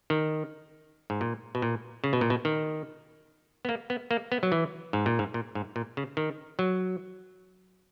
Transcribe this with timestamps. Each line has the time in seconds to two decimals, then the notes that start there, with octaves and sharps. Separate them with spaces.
0.10 D#3
1.10 G#2
1.21 A#2
1.55 B2
1.62 A#2
2.04 C#3
2.13 B2
2.21 A#2
2.30 B2
2.45 D#3
3.65 B3
3.69 A#3
3.90 B3
4.11 A#3
4.32 B3
4.43 F#3
4.52 E3
4.93 G#2
5.06 A#2
5.19 G#2
5.34 A#2
5.55 G#2
5.76 A#2
5.97 C#3
6.17 D#3
6.59 F#3